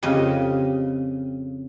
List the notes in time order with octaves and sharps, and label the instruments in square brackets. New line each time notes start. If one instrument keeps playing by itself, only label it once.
[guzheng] F2 C#3 G4 D#5